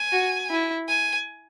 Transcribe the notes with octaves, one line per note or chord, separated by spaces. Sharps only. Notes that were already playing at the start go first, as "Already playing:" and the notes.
Already playing: G#5
F#4
E4
G#5